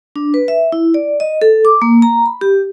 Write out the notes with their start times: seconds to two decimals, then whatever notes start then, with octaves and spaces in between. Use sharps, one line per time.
0.16 D4
0.34 B4
0.48 E5
0.72 E4
0.94 D5
1.20 D#5
1.41 A4
1.65 D6
1.82 A#3
2.02 A#5
2.26 B5
2.41 G4